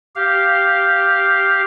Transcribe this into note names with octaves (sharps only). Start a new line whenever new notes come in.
G4 F5